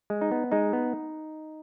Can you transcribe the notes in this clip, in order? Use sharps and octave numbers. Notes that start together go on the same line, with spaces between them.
G#3
D#4
B3
G#3 D#4
B3